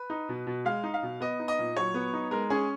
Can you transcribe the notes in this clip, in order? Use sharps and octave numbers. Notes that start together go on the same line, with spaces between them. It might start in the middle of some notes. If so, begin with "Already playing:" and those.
Already playing: B4
D#4
B2
B2
G#3 F5
D#4
F5
B2
B3 D#5
D#4
D#5
A#2
F#3 C#5
B3
D#4
G#3 A#4
C#4 G#4